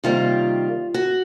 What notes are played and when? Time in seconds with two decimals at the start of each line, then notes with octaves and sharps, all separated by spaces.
0.04 C3 D#3 G3 A#3 F4
0.94 F#4